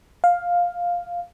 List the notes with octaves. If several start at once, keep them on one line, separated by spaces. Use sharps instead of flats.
F5